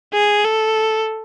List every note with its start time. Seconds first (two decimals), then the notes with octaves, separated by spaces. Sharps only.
0.13 G#4
0.44 A4